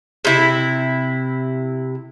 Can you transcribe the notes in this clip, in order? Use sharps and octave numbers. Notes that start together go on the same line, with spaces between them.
C3 E4